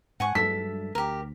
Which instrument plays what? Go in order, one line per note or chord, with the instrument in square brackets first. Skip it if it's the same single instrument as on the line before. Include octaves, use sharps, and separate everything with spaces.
[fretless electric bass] G#2 [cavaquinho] F#5 G#5 C#6
[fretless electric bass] G2 F#3 G#3 [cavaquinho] A4 E5 [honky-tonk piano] B6
[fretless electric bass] D2 [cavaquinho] G4 A#4